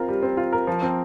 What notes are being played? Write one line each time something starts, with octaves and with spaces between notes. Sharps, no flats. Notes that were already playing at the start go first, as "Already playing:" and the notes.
Already playing: C4 F4 A#4
G3
C4
F4
A#4
F3
C4